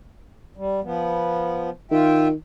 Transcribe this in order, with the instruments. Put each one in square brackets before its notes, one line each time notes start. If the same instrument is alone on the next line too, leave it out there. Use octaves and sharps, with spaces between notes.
[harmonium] G3
F3 B3
[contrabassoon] D#3 [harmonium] F4 E5 G5